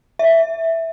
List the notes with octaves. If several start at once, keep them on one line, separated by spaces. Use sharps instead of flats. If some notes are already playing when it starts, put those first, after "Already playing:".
E5